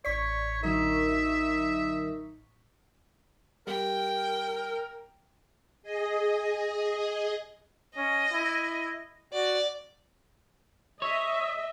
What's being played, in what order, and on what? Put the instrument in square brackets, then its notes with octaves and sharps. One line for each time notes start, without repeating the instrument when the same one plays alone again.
[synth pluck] A1 C#6 B6 [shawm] C#5 [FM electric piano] D5
[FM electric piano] D3 F#3 A#4 [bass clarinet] D#4 [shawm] E5
[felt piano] G3 [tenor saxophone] A#4 [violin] G5
[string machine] G#4 D#5
[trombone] C#4 [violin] D#5
[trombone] E4
[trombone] F#4 [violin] D5
[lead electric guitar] C#5 [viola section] D#5 E5